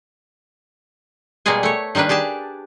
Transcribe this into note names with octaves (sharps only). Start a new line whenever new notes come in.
B2 G3 G#3 A#3 G#4 G#5
A3 C#5
D#3 G3 A#3 D4 B4
G4 G#4 D5 A5